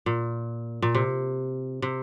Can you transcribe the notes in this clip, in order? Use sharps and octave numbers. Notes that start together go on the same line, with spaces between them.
A#2
A#2
C3
C3